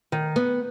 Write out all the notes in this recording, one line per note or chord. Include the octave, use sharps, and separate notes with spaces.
D#3
B3